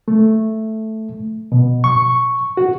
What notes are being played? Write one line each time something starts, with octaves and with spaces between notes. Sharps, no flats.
A3
B2
C#6
F#4